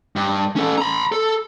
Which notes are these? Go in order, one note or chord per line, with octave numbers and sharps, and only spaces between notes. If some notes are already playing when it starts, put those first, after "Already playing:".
G2
C#4 A4
A#5 B5
A4